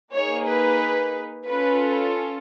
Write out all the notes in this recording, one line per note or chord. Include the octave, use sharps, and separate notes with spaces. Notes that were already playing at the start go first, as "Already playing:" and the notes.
A#3 D#4 G#4 C#5
B4
C#4 F4 A4 B4